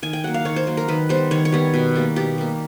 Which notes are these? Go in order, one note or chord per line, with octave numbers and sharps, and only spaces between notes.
D#3 G#5
G5
F#3 A#3 F#5
F5
D#3 C#5
C5
F#3 A#3
A#4
D#3 B4
G3 B3 C5
D#3 C#5
C#5
G3 B3
B2
G3 A#3
B2 G4
G3 A#3